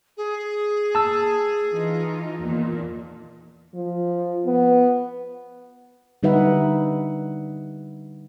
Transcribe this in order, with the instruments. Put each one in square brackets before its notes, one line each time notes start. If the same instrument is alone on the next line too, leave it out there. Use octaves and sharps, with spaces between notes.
[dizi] G#4
[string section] A#3 [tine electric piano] A5 E6
[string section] E3 D#4 F4
E2 A#2 D#3
[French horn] F3
B3
[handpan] D3 G3 D#4 B4 E5 F#5